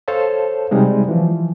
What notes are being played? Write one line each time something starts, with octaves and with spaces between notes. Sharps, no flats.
A4 C5 C#5 F5 A5
C3 G3 G#3 D#4
E3 F3